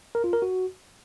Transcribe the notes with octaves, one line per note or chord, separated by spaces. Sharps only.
A#4
F4
A#4
F#4